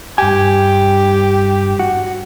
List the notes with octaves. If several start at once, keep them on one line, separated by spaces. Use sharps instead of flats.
G2 G4 G#5
F#4